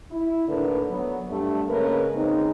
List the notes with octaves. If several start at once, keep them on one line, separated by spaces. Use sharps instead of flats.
E4
D#2 A2 D3 A#4 B4
F#3 B3
G2 A3
C#3 G#3 A#3 C#4 A#4 B4
C#3 G#3 C4 D#4